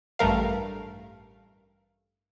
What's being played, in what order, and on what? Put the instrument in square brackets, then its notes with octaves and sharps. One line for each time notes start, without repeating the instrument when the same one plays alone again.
[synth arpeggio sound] A1 G2 A3 A#4 F5